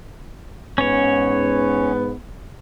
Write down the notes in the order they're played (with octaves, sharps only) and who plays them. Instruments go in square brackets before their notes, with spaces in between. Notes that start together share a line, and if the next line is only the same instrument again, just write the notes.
[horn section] G#2 B3 [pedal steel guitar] C#4 C#5